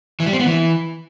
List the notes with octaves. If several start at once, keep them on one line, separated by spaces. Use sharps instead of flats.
E3
G3
C4
B3
E3